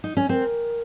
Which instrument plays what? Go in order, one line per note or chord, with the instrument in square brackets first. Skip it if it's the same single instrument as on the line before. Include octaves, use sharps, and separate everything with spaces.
[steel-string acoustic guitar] D#4
C#4
[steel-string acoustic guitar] C4 [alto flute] A#4